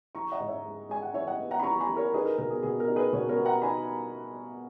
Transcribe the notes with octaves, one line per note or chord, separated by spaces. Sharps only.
E3 A#5 C#6
D#5 F#5
G#2
C#5 E5
G#3
G#3 G#5
F#5
E3 C#5 E5
D#5 F#5
B3
F#5 A#5
B5
E3 A#5 C#6
G#5 B5
E3
A#4 C#5
D#4 G#4 B4
A#4
B2 A#4
G#4
B2 G#4
A#4
D#4
G#4 B4
B2 A#4 C#5
A#4 C#5
B3
F#5 A#5
D#4 G#5 B5